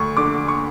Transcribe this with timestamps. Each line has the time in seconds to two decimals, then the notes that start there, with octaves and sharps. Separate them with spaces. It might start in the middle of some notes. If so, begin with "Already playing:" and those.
Already playing: D2 C#6
0.17 D3 D6
0.48 C#6